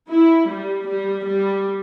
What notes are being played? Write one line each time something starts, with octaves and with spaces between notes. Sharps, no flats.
E4
G3
G3
G3